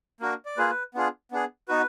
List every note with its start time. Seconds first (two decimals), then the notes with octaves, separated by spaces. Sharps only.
0.21 A#3 D4 F#4 A#4
0.45 D5
0.57 A#3 F4 G#4 B4
0.70 B4
0.95 B3 D4 F4 G#4
1.32 B3 D4 G#4
1.68 B3 D#4 F#4 B4